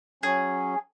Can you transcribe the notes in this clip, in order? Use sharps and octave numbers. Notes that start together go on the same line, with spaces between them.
F#3 C#4 G#4